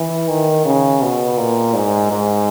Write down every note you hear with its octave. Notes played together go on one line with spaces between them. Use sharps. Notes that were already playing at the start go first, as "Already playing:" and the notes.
Already playing: E3
D#3
C#3
B2
A#2
G#2
G#2